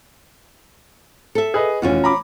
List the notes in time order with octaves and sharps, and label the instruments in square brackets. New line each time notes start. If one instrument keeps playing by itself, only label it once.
[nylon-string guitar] A4 E5
[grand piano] G#4 B4 D#5
[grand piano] F1 E3 [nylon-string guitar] C#4 F4 F#4
[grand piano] A#5 B5 D6